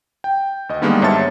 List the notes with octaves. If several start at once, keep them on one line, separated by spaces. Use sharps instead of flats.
G5
D2 D#5
D3 D#3 G3 G#3 A#3 B3
G#2 C#5 E5 A5 A6 C#7